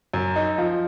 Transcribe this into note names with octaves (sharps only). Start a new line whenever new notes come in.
F#2
D#4
F3